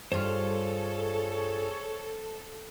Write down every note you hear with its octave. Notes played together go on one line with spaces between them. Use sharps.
G2 F4 G#4 A4 C5 C#5 F6